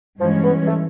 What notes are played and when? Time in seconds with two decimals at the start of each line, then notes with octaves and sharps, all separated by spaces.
0.20 G2 E3 F3 G#3 C#4
0.44 B3
0.67 A3